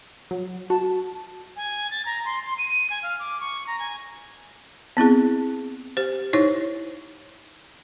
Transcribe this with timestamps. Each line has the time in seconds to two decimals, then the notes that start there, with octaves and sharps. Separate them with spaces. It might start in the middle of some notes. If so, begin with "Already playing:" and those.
0.31 F#3
0.70 F#4 A5
1.56 G#5
1.91 A6
2.05 A#5
2.25 C6
2.46 C6
2.58 D#7
2.90 G#5
3.03 F5
3.19 D6
3.40 C#6
3.67 A#5
3.79 G#5
4.97 B3 C4 E4 G#4
5.97 G4 C5
6.33 D#4 E4 C5 C#5